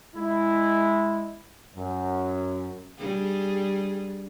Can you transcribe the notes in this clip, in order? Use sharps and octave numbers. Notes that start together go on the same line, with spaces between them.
G#3 E4
F#2
G3 D4 G#4